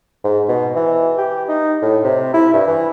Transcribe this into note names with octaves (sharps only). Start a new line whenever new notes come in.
G#2
B2
E3
G4
D#4
A2
C3
E4
G2
E3